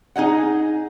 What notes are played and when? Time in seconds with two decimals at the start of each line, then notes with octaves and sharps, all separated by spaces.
0.16 D#4 G#4 D#5 F#5